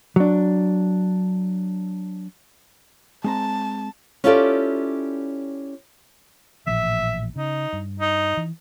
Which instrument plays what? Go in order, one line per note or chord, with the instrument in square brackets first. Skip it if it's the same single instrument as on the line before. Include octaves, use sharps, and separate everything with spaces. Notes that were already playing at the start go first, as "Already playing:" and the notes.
[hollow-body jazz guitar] F#3 D4
[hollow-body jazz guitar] G#3 C4 A#5 [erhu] A5
[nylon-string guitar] C#4 E4 F4 G4 A4 D5
[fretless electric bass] A1 A#2 F3 [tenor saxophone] E5
[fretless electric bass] C#3 [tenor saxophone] D#4
[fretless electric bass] G2
[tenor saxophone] D#4
[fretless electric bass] E3